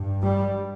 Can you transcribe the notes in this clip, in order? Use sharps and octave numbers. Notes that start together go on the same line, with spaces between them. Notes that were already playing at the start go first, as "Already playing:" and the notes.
Already playing: G2
G3